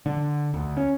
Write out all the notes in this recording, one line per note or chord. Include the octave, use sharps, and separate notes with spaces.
D3
D2
C#4